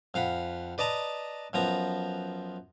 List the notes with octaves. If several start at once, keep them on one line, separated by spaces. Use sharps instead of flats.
F2 F5 F#5 B5
B4 D5 D#5 A5 A#5
F#2 F3 B3 A#5